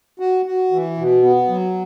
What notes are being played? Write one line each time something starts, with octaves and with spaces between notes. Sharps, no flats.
F#4
F#4
E3
B2
B3
F#3